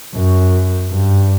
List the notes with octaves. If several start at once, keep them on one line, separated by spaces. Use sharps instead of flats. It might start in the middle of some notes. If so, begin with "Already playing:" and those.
F#2
G2